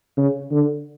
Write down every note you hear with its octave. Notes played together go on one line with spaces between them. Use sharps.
C#3
D3